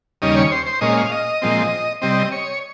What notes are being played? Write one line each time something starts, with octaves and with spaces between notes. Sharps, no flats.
D#2 C#3 G3 C#4 D#5
C#5
C5
C5
A#2 G#3 C#4 D#5
F5
D#5
A#2 F3 G#3 C4
C3 G3 C4 D#5
C#5